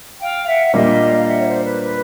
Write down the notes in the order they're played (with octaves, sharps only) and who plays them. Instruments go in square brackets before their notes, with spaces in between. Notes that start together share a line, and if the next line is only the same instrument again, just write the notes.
[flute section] F5 G5
E5 F#5
F#5
[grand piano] A#2 G3 A#3 D4 [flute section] D#5 F5
[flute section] E5 F#5
C#5
C5
B4
B4